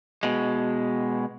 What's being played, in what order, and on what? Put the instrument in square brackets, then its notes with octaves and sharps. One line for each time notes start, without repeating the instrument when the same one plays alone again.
[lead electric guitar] B2 G#3